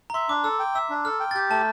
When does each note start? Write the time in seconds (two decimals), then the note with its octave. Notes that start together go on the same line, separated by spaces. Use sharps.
0.10 A#5
0.14 E5 C6
0.29 D4 D6
0.44 A4 E6
0.59 G5
0.75 E5 E6
0.90 D4
1.05 A4 F6
1.20 G5
1.31 A6
1.35 G4 G6
1.50 A3 A5